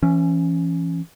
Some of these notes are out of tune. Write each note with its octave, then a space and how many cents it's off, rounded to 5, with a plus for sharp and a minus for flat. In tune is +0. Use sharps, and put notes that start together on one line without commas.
E3 +25 C#4 +0